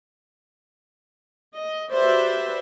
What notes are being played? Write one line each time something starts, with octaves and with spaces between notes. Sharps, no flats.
D#5
F#4 G4 B4 C5 D5 E5